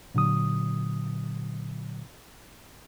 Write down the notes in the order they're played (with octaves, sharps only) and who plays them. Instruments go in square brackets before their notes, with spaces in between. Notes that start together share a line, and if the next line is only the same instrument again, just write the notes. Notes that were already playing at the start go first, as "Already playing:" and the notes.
[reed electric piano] A#2 D3 F#3 D#6